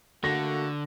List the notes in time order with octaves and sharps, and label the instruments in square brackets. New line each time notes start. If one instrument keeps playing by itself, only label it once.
[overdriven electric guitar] D3 [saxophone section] A3 A#3 F#4 [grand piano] A#6